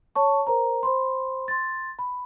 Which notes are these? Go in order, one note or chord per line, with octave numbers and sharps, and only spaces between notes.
C#5 A5 C#6
A#4 C5 A#5
C5 B5 C6
C6 A6
B5